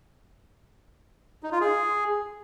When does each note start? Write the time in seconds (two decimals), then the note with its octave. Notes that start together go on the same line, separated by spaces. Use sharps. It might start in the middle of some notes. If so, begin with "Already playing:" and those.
1.43 D#4
1.52 F4
1.61 G#4